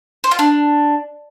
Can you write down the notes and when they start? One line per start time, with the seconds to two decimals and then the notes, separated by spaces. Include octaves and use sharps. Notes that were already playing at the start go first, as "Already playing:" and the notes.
0.24 C5
0.31 F4
0.39 D4